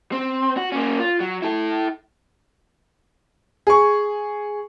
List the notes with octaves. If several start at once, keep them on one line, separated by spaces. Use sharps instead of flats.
C4
F#4
A#3 C#4
F4
F#3
E4 A4
G#4 C#6